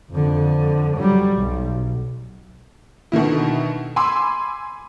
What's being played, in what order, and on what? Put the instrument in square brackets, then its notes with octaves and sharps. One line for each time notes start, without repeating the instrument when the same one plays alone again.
[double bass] F2 D3
F#3 G3
B1
[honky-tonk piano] B2 D3 D#3 E4
G#5 B5 C6 D6 E6